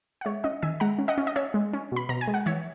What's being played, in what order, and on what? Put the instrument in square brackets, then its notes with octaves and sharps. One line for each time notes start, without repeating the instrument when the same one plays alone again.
[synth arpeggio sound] F#5
G#3 C#5 E5
C#4 D#5 F#5
D#3 E5 G#5
G#3 F#5 A#5
C#4
D#5 F#5
C#4
D#5
C#4 C#5 E5
G#3
C#4
B2 B5
B2 A#5
G#5
G#3
F#5
E3 C#5 E5